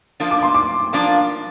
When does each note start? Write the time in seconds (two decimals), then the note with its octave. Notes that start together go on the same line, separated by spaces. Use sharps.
0.20 F3 A#3 D4 F4
0.31 D6
0.43 C6
0.55 D6
0.93 F3 A#3 D4 F4 D6